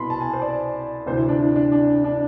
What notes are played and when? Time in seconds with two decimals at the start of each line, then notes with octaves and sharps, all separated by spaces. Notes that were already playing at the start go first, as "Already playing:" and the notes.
Already playing: C2 B2 B5 C6
0.10 A5
0.21 G#5
0.33 C5
0.42 D5
1.06 D2 C3 E3 C5
1.17 E4
1.29 D4
1.39 E4
1.56 D4
1.72 D4
2.04 D4